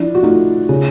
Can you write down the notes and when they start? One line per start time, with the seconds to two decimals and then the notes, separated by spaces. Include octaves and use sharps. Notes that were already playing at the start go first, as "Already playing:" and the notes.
Already playing: F3 D4 E4
0.15 F#4
0.23 A3 D#4 F4
0.69 C#3